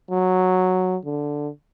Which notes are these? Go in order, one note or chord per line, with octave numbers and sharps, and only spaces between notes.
F#3
D3